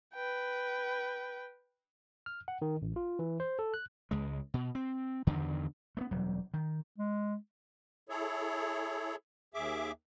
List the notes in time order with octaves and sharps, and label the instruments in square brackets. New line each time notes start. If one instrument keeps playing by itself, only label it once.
[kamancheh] B4 G5
[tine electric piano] F6
F#5
D#3
A1
F4
E3
C5
A4
F#6
[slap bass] C#2 G#3
B2
C4
E2 G2 D3 D#3
A3 B3
E1 F#3 G3
D#3
[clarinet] G#3
[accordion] E4 G#4 A4 C#5
D#2 G#4 E5 D6